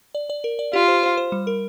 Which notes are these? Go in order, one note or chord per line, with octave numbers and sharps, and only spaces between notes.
D5
D5
A#4
D5
F4 G4
C5
C5
C5
G3
A#4